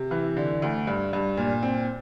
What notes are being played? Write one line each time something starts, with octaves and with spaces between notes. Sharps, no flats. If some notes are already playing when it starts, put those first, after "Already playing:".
Already playing: C3
E3
D3
D2
G2
G2
A#2
C4